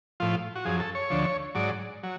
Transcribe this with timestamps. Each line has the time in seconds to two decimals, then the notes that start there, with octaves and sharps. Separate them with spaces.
0.20 A2 F3 F4
0.55 F#4
0.65 F#2 F3 G#4
0.80 A4
0.95 C#5
1.10 D2 D3 F3
1.55 G#2 F#3 D5
2.03 F#3